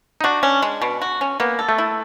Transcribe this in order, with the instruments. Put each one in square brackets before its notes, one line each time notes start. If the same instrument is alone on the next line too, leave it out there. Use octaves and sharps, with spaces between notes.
[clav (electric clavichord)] D#4
[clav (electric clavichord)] D4 [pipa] F#4
[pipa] C#4
G#3
B2
F#4
C#4
[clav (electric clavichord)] A#3 [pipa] B3
[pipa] A4
[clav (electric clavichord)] A3
[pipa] E4